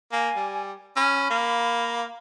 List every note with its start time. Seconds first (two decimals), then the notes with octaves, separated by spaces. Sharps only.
0.12 A#3 G#5
0.36 G3
0.97 C#4 B5
1.30 A#3